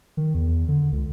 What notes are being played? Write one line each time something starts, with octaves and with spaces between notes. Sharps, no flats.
D#3
E2
D3
C#2